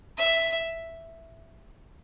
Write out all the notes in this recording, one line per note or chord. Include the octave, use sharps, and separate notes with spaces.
E5